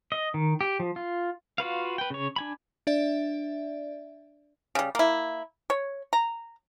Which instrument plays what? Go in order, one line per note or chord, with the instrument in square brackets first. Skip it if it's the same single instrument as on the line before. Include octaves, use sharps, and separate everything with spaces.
[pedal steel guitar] D#5
D#3
G4
F3
F4
F4 F#4 B4 F5
B4 G5
C#3 C#5
D4 G#5 B5
[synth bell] D4 D5 E5
[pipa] C#3 G3
A#3 E4
C#5
A#5